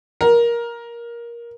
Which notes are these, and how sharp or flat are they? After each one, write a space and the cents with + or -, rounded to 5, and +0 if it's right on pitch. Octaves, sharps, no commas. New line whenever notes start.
A#4 +15